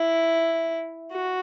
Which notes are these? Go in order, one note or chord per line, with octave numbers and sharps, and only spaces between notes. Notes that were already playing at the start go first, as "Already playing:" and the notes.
Already playing: E4
F#4